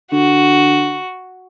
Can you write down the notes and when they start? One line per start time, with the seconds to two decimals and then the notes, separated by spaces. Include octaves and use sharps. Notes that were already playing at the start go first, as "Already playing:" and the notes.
0.12 D3 F#4